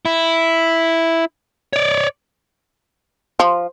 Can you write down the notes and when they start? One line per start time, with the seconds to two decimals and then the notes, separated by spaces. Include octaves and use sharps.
0.05 E4
1.73 C#5 D5
3.40 F3